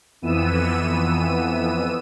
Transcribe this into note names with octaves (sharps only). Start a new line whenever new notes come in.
F2 E3 B3 E6 D#7